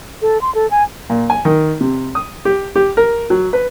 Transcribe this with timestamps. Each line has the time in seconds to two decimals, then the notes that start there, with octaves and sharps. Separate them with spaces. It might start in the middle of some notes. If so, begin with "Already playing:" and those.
0.22 A4
0.41 C6
0.55 A4
0.71 G#5
1.10 A#2
1.30 G#5
1.45 D#3
1.81 C3
2.15 D#6
2.45 G4
2.76 G4
2.97 A#4
3.30 F#3
3.53 B4